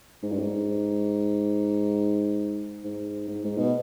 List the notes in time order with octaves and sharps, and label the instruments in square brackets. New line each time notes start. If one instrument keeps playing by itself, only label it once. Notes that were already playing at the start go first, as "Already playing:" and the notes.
[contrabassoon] G#2
G2
G#2
G#2
G#2
G#2
B2